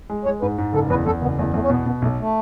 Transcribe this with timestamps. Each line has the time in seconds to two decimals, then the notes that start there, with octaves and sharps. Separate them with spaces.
0.10 G#3
0.25 G#3 C#5
0.42 G#2 B4
0.58 G#2
0.73 F#1 A4
0.90 E2 B4
1.06 E2 A4
1.22 F#1 B3
1.38 E2 A3
1.54 E2 A3
1.62 C#4
1.70 B2 B3
1.86 B2 B3
2.02 B1 A3
2.19 A3